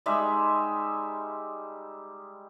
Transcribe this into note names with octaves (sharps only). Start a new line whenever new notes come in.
G3 G#3 D#4 E5